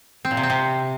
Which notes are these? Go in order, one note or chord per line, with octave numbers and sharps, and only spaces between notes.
C4
A#2
C3
C4
C3